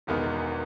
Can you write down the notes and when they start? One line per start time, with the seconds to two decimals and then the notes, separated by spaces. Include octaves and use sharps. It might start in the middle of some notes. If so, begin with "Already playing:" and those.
0.07 E1 E2 D#3 G#3 B3